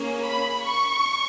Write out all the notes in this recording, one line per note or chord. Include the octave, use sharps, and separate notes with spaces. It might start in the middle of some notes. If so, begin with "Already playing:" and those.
Already playing: A#3 C#4 G#4
B5
C#6